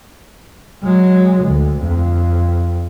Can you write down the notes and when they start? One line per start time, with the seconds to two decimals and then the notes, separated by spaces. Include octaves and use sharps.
0.83 F#3 G#3
1.43 D2 D3
1.81 F2